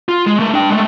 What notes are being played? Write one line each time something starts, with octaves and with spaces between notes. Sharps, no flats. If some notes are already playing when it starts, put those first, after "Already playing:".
F4
G#3
A3 A#4
D4 G5
G#3 A3